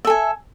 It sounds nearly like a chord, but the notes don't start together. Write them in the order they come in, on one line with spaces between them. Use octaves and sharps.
E5 A4 G#5